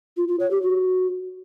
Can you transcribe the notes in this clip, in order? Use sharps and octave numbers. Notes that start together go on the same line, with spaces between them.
F4
F4
C#5
G4
F#4